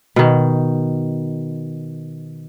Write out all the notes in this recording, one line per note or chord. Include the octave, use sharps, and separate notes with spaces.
B2 D#3